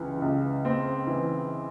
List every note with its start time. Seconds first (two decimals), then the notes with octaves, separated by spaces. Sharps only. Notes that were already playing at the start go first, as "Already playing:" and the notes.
Already playing: C#2 E3
0.22 C#2
0.65 C4
1.07 E3